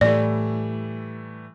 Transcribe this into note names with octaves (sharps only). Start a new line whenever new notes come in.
A2 E3 G3 A3 D5